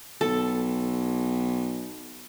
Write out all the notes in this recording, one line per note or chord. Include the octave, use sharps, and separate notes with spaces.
B1 A4